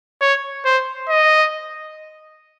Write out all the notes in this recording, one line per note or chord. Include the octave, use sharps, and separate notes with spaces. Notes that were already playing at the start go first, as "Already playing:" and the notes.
C#5
C5
D#5